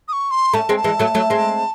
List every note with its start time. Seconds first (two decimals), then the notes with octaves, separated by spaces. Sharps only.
0.08 D#6
0.13 C#6
0.31 C6
0.53 A3 C#4 A5
0.69 G#3 C4
0.77 A5
0.84 E3 G#3
0.99 F#3 A3
1.15 F#3 A3
1.30 G#3 C4